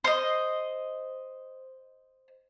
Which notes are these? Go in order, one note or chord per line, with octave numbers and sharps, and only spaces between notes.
C5 D#5